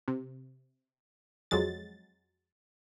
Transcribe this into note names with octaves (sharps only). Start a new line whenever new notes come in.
C3
F2 F#3 G#3 A6